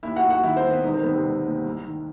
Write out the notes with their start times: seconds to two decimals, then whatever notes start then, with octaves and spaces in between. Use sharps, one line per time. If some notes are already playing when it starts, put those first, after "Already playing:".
0.03 D#2 E4 E5
0.16 F#4 F#5
0.23 D#2
0.30 F#4 F#5
0.43 D#3 E4 E5
0.56 C4 C5
0.64 D#3
0.70 B3 B4
0.84 E1 D#4
0.94 C4
1.03 D#3 B3
1.13 C3 C4
1.24 E1
1.45 D#2
1.65 C2
1.85 D#3